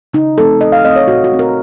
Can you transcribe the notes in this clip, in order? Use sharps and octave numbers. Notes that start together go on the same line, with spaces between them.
C#3 D#4
F3 A3 C4 A4
A#2 D#5
F5
A3 C4 D#5
C#5
A#2 F#4
F#4
A3 C4
A#4